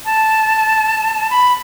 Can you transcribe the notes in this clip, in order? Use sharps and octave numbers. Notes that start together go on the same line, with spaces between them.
A5
B5